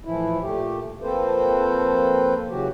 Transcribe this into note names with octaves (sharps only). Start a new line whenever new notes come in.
A2 E3 F3 E4
A#2 A3 G4
F3 A#3 C4 A4 B4 C5
C#3 E3 F#3 F#4 G4